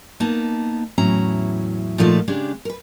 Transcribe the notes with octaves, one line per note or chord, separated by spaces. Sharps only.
A#3 B3 D#4 A5
E2 A2 F#3 C#4 E4 A#5
A#2 F3 F#3 A3 D#4 F4
C#3 G#3 D4 G4
A#4 B4